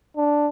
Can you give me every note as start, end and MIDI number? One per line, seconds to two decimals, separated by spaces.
0.17 0.48 62